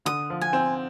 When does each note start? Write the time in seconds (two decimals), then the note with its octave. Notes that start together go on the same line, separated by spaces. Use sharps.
0.05 D3 D#6
0.30 F3
0.41 G#5
0.53 C4